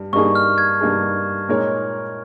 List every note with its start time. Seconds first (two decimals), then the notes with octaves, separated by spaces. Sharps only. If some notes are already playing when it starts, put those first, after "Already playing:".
Already playing: G2 G3
0.13 G2 G3 A#3 D#4 G#4 C#6
0.35 F6
0.58 G#6
0.81 G2 G3 A#3 D#4 G#4
1.48 A#2 G#3 D#4 A#4 C#5